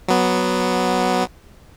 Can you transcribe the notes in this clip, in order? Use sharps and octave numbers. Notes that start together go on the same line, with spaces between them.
F#3 B3